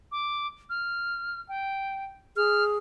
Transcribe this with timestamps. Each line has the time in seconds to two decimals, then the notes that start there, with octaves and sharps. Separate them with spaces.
0.12 D6
0.69 F6
1.49 G5
2.36 G#4 F6